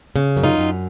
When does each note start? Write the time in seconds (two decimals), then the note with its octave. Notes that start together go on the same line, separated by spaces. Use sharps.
0.16 C#3
0.37 F#2
0.44 D#4 F4
0.58 F#2